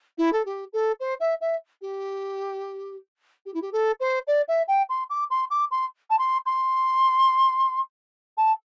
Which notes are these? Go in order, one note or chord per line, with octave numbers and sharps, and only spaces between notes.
E4
A4
G4
A4
C5
E5
E5
G4
G4
E4
G4
A4
C5
D5
E5
G5
C6
D6
C6
D6
C6
A5
C6
C6
A5